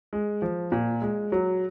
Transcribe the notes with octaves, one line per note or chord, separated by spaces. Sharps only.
G#3
F3
A#2
G#3
F#3